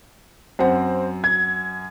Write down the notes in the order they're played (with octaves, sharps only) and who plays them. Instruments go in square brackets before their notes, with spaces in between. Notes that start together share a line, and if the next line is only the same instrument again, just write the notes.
[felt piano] F#2 F#5 [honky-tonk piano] C4
[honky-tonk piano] G#6